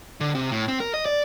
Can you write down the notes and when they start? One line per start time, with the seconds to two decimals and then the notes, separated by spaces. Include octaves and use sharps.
0.21 D3
0.35 C3
0.52 A2
0.68 C4
0.80 A#4
0.94 D#5
1.06 D5